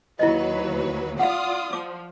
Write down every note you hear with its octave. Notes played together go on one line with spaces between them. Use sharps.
D#2 F#3 E4 B4 D#5
F4 D5 F5 F#5 D#6
F3 D6